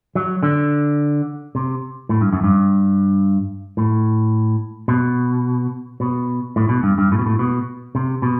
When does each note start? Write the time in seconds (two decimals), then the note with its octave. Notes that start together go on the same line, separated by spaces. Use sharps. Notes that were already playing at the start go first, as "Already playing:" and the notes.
0.15 F#3
0.43 D3
1.55 C3
2.09 A2
2.21 G2
2.32 F#2
2.44 G2
3.77 A2
4.88 B2
6.00 B2
6.56 A2
6.69 B2
6.83 G2
6.98 G2
7.12 A2
7.19 B2
7.26 A2
7.39 B2
7.95 C3
8.22 B2